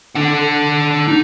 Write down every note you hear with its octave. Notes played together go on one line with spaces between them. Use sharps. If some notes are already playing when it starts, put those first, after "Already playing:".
D4 F#5
D#4